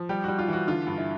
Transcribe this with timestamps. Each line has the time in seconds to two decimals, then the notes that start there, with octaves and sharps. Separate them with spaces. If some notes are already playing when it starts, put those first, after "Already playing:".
Already playing: F3
0.09 G3 G4
0.24 G3 F#4
0.39 F4
0.48 E3
0.53 F#4
0.68 D3 F4
0.87 G2
0.98 E4